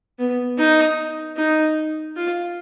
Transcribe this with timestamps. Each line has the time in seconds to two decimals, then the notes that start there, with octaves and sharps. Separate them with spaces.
0.19 B3
0.58 D#4
1.37 D#4
2.16 F4